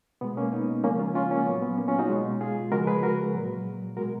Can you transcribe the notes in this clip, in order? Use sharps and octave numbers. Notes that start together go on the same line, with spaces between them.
B2 G#3 B3
A#3 C#4
B3 D#4
C#3 F3 G#3 A#3 C#4
C#4 F4
C#4 F4
A#3 C#4
A#2 F#3 B3
B3
A#3 C#4
C#4 F4
D#4 F#4
B2 G#3
F4 G#4
C#3 F3 G#3 F#4 A#4
G#4 B4
F#4 A#4
A#2 F#3
B2 G#3 F#4 A#4